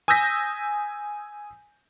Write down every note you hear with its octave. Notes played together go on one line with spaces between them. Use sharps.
G#5 D#6 E6 G6 A#6 B6